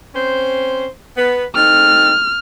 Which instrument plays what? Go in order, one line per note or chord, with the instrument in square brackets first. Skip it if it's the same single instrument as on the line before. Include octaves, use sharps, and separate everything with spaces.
[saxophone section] C4 C#4 C5
B3 B4
[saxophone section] A3 C4 D#4 [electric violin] F6